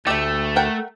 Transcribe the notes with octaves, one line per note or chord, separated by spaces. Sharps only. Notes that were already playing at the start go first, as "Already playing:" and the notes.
D2 A3 G4 A4 E5
A#4 F#5 G5